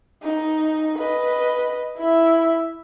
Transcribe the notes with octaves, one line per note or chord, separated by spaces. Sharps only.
D#4
B4 D#5
E4 E5